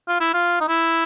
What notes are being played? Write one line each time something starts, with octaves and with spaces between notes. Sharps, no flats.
F4
E4
F4
D#4
E4